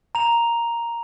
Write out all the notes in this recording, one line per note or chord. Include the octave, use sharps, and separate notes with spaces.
A#5 F7